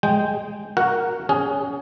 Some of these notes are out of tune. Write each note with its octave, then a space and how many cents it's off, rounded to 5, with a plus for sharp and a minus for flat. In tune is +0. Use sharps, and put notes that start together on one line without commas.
G#3 +0 G5 +5
F#4 +0 A#4 +0 F#5 +0
C#4 +25 G#4 +0